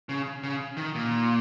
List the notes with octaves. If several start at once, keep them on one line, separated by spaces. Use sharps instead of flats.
C#3
C#3
D#3
A#2